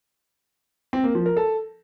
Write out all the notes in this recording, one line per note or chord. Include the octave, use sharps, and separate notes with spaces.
C4
A#3
F3
A#4
A4